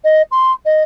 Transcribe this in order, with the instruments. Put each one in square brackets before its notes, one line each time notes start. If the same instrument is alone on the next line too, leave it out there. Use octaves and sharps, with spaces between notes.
[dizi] D#5
C6
D#5